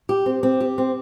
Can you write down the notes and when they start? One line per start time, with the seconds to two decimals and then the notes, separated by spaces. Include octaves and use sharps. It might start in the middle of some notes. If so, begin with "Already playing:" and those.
0.09 G4
0.26 C4
0.43 C4
0.60 G4
0.78 C4